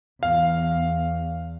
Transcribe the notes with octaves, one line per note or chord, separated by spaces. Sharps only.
E2 F5